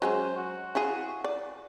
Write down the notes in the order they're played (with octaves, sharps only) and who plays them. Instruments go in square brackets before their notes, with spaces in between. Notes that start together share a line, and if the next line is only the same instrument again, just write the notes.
[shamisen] F#3 G#3 C#4 [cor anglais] C5
[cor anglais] F#4
[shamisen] E4 F4 G#4
D5